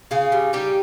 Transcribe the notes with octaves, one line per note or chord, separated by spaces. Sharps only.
C#3 F4 G#4
G3
G3 D#4 G4